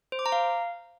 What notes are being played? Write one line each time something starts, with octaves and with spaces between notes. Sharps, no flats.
C5
D6
A#5
F5